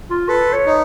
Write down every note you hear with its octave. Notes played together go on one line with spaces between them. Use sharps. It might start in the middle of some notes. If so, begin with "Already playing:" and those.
F4
A4 B4
C#5
D#4